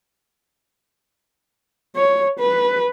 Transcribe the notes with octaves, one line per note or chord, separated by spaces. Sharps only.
C#5
B4